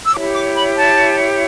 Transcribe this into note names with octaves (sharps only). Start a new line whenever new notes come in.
E6
E4 G4 C#5 D6
D6
B5
A5